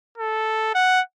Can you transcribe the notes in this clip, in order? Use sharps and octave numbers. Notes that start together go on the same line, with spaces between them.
A4
F#5